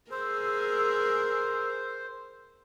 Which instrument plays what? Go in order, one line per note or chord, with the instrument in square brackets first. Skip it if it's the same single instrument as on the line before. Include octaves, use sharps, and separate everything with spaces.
[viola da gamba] G#4 A#4 [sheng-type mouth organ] C5 [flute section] E6